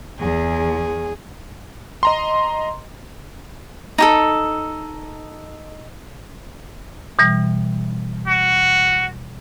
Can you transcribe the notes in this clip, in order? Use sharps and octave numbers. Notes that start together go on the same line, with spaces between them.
E2 G#4
D#5 A#5 C6
D#4 G4 A4
B2 E3 G3
F#4